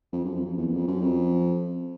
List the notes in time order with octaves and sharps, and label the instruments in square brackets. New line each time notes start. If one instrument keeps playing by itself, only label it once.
[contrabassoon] F2
F#2
F2
F2
E2
E2
F2
F#2
F2